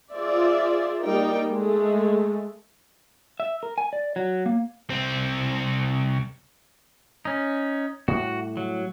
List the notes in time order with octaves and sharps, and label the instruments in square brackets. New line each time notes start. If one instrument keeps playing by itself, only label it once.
[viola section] F4 G#4 C5 D5 E5
G3 A#3 D#4 A#4 G5
G#3 A3
[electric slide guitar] E5
A#4
G#5
D5
F#3
A#3
[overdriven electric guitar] C2 C4
[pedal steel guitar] C#4 D#4
[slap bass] A2 G3 [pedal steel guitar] F#4
[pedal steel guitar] F#3